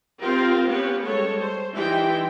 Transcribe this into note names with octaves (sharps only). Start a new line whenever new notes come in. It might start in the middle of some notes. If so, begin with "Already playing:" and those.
C4 F4 G4 A#4 F5
B3 C#4 G4 B4
G3 G#3 A4 C#5
C5
E3 G3 D#4 E4 G5 C6